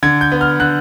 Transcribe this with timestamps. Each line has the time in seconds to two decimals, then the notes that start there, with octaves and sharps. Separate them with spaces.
0.03 D3 G#6
0.21 G6
0.32 B3
0.41 F6
0.60 D3 F#6